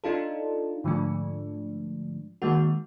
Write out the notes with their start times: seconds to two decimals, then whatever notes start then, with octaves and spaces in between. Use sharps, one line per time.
0.04 D4 D#4 F4 A4
0.84 G#2 D3 F3 G#3 A3 D4
2.42 D#3 G#3 A#3 F#4